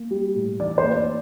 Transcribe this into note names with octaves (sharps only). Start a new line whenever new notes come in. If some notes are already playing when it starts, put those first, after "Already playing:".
Already playing: A#3
G3
A2
E3 D5
C5
A#3
D5